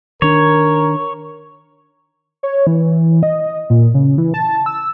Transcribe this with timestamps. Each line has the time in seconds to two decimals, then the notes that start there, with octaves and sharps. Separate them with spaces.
0.22 D#3 D4 A#4 C#5
2.43 C#5
2.67 E3
3.23 D#5
3.70 A#2
3.94 C#3
4.18 E3
4.34 A5
4.66 E6